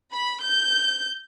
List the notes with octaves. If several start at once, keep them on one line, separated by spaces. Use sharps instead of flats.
B5
G6